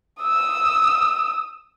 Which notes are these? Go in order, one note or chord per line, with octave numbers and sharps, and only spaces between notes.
D#6 E6